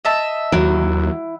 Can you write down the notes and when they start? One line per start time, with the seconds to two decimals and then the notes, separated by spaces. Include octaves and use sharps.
0.05 D#5 E5 A5
0.52 D#2 F#3 E4